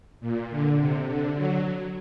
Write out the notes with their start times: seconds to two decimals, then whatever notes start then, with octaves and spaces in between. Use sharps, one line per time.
0.21 A#2
0.50 D3
0.78 C3
1.08 D3
1.36 F#3